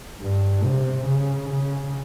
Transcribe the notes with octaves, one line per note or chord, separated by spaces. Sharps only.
G2
C3
C#3
C#3